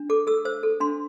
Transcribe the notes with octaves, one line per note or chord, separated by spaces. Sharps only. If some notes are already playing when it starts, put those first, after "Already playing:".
Already playing: D4
A4 D6
A4 E6
C5 E6
A4
D4 C6